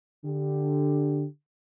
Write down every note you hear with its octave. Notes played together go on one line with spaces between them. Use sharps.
D3 G4